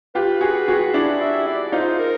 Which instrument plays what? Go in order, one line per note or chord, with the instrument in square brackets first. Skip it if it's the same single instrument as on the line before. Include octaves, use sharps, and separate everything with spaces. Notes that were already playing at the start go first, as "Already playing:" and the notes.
[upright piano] F4 G4 [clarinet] B4
[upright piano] F#4 G#4
F#4 G#4
D4 E4
[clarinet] E5
D5
[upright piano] D#4 F4 [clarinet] C5
[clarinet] A#4